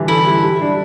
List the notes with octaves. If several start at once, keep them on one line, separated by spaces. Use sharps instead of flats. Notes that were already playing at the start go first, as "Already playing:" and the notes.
Already playing: D3 E3 G3
E4 A4
G3
G3
D4